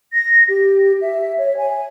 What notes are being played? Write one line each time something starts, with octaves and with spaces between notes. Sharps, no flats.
A#6
G4
E5
C#5
G#5